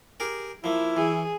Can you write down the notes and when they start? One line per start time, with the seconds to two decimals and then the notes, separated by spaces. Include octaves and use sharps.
0.20 G4 G#4 A#4
0.64 F3 A#3 E4
0.97 E3 G#4